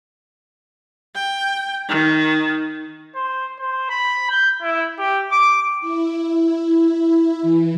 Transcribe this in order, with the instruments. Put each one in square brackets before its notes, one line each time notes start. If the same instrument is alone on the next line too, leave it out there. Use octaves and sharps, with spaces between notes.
[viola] G5
D#3
[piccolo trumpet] C5
C5
B5
G6
E4
G4
D6
[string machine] E4
E3